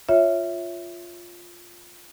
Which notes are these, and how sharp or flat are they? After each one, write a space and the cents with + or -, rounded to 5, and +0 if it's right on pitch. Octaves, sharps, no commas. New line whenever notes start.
F4 +0 C#5 -5 E5 +0